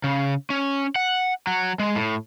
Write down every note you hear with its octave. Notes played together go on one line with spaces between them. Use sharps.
C#3
C#4
F#5
F#3
G#3
A2